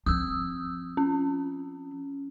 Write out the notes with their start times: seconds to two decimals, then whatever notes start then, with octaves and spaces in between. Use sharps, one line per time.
0.06 F3 C4 D#6 E6
0.97 C#4